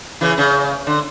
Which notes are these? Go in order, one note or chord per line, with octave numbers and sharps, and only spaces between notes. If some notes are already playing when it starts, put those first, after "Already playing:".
C#3 E3
C#3
D3